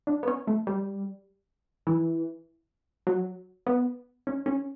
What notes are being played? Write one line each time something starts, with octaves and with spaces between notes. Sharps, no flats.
D4
B3
C#4
A3
G3
E3
F#3
B3
C#4
C#4